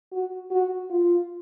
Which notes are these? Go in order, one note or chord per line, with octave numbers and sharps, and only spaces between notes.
F#4
F#4
F4